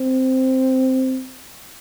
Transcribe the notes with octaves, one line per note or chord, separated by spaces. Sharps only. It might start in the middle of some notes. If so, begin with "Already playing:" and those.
Already playing: C4